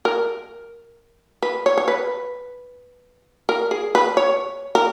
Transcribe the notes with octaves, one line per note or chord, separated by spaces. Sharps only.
A#4
B4
C#5
C#5
B4
A#4
G#4
B4
C#5
A#4